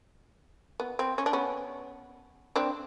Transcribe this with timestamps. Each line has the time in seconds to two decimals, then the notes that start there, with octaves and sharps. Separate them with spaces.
0.80 B3
0.99 C4
1.18 C#4
1.26 D4
1.33 B3 C#4
2.56 C4 D4